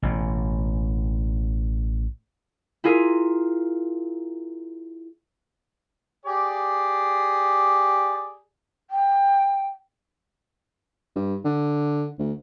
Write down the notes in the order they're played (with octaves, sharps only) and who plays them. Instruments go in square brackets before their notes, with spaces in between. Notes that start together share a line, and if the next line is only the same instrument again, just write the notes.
[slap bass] A1 B2
[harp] E4 F4 G#4 A#4
[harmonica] G4 G#4 D5
[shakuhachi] G5
[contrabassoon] G2
D3
D2